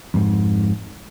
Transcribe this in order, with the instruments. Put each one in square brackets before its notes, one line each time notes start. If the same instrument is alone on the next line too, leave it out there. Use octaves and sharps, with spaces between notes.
[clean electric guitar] F2 G#2